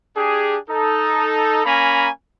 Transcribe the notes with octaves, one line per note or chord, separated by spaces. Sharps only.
D4 G4 G#4
D#4 A4
A#3 C#4 G#5 A#5 B5